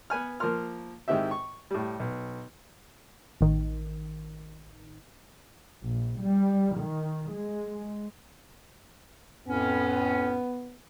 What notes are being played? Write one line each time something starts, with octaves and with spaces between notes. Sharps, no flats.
B3 B4 G#5 F6
F3 A#3 A#4 C6 F6
G#2 D#3 C4 E4 G4 E5
C#6
A2 G3
B1
A1 D#3
A#1
G3
D#3
G#3
F2 A2 B3 C#4